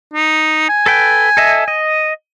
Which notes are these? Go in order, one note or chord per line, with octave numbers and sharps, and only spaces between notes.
D#4
G#5
A4 B4 G5
A4 D#5 E5
D#5